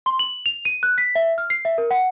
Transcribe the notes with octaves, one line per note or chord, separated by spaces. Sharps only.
C6
F#7
F7
D#7
F#6
B6
E5
F6
C7
E5
A#4
F#5